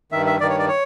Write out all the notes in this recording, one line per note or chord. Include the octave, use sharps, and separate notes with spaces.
G2 D#3 E5
E5
G2 D#3 D5
C#5
D5
C#5